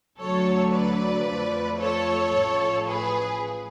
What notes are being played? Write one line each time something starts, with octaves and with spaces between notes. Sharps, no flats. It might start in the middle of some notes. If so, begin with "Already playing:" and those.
D2 D3 F#3 A3 A4 C#5
B4 D5
F2 F3 A3
A4 C#5
A1 A2 F3
G#4 B4